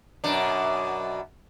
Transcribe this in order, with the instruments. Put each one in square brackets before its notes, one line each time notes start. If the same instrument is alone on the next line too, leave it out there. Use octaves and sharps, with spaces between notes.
[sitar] F#2 B2 D4